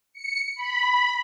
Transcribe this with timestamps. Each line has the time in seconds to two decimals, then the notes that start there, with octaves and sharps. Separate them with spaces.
0.13 C#7
0.55 B5